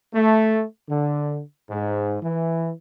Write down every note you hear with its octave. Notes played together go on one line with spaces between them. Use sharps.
A3
D3
G#2
E3